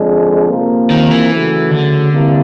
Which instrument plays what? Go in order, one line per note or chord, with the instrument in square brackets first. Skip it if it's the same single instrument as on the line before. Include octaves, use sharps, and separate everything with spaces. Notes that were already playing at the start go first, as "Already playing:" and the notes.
Already playing: [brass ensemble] F2 D3 F3 G#3
C3 F3 A#3
[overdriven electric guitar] D#3
E3
[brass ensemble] C#3 F#3 A3
[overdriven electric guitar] D3
[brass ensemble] C3 E3 G3 A#3